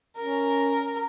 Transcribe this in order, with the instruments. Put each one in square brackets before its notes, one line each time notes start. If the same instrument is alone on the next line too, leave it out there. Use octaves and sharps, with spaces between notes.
[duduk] C#4 [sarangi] A#4